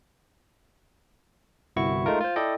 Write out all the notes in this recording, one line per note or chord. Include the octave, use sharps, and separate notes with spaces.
G1 C2 E4 F#4 C#6
G#3 A3 D#4 F4 A#4
F4 C5
E4 A4 D5 D#5 G5